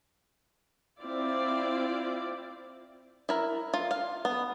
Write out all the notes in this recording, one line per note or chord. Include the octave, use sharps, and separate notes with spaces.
C4 E4 F4 D5
E4 A#4
F4
F5
B3